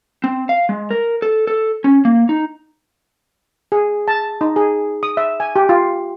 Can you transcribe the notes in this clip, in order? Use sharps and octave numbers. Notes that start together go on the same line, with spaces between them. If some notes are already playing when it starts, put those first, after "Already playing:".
C4
F5
G#3
A#4
A4
A4
C#4
A#3
D#4
G#4
A5
D#4
G#4
D#6
E5
G#5
G4
F4